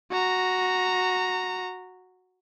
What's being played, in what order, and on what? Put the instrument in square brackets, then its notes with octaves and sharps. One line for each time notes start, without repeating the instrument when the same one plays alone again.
[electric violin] F#4 A#5